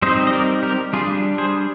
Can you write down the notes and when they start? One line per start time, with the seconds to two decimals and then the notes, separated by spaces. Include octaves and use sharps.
0.02 G3 C4 D#4 C5 D#5
0.27 D#5
0.33 A#4 D5
0.63 G4 A#4
0.93 G3 D4 F4 G#4
1.38 G#4 C5